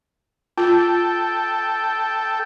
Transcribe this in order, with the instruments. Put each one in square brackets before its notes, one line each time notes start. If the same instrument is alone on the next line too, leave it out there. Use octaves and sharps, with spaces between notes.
[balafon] F4 [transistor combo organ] A4 G5